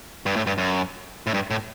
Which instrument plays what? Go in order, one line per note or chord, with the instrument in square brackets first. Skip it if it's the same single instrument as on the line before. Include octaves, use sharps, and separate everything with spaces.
[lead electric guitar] G2
A2
G2
F#2
A2
G2
A2